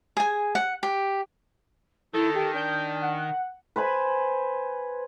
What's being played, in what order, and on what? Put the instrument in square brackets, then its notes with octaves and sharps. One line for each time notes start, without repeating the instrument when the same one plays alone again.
[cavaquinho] G#4 G#5
F#5
G4
[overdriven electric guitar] D#3 [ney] E4 [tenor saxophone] A4
[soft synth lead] G4 [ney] G5
[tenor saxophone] D4 [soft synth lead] G6
[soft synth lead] F#5
[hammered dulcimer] B4 C5 G#5 B5